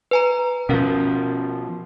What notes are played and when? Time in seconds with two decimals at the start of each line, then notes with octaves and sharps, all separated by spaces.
0.11 B4 G#5 A#5
0.69 B2 F3 C#4 A#4 F5